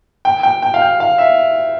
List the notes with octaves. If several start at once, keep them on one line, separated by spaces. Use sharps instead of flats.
G5
G5
G5
F5
G5
F5
E5